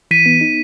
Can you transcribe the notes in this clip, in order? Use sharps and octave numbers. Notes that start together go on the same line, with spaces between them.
E3 B6 D#7
B3
D#4